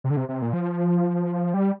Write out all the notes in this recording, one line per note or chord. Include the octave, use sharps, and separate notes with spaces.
C3
D3
C3
C3
A#2
F3
G3